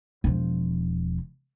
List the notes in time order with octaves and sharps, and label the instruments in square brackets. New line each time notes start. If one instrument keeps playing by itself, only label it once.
[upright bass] E1 F3